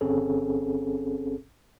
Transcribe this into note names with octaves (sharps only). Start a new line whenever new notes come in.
G1 C4 C#4 G#4 A4